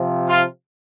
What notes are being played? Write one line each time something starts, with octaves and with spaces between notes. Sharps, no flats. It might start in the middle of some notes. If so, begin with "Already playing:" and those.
Already playing: C3 F3
F4